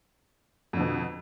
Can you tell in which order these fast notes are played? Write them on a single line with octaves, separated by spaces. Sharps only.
F2 D3 B2